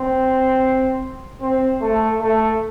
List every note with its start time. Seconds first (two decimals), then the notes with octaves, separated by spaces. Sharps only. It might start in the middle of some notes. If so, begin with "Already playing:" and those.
Already playing: C4
1.42 C4
1.81 A3
2.21 A3